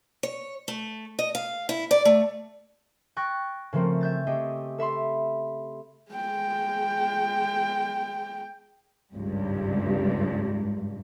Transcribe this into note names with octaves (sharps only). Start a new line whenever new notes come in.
C#5
A3
D#5
F5
E4
D5
A3
G5 C#6 F#6 A6 A#6
C#3 F3 A3 A#3 C4
E5 G6 A6
A3 C4 G4 G#4 D#5
A4 E5 B5 C6
G#3 G5
G#1 C#2 G2